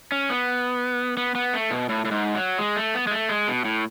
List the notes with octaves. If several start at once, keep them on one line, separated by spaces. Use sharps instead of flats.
C#4
B3
B3
B3
A3
B2
A2
A2
G#2
F#3
G#3
A3
B3
G#3
A3
G#3
B2
A2